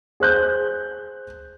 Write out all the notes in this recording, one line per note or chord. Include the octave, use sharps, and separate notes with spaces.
G#4 C5 F#6 G6